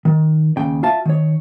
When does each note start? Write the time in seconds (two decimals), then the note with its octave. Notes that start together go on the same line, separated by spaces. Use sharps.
0.05 D#3
0.57 D#2 C#3 G5
0.83 F4 E5 A5
1.05 D#3 C#5